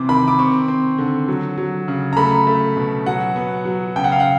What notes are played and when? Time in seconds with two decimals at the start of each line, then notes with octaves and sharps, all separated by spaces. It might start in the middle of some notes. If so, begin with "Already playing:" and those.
Already playing: C3 E3 C4 D6
0.09 D#3 B5
0.28 D6
0.39 C4 C#6
0.68 C4
0.98 D3
1.28 F#3
1.58 F#3
1.88 C#3
2.13 A#5
2.17 A3 B5
2.47 A3
2.77 B2
3.06 F#3 F#5
3.36 B3
3.65 F#3
3.96 C#3 G5
4.04 F#5
4.12 F5
4.20 F#5